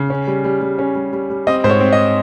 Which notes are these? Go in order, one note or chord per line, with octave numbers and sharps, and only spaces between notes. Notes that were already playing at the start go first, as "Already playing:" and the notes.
Already playing: C#3
C#4
G3
G3
G3
C#4
G3
G3
G3
C4 D#5
G#2 C5
C#5
C4
D#5